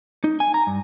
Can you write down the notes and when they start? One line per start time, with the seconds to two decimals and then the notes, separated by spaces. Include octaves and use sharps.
0.24 D#4
0.40 G#5
0.54 A#5
0.67 G2